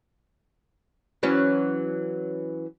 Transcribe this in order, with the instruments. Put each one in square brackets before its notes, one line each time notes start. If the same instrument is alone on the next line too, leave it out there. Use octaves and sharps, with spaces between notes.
[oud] E3 F#3 C#4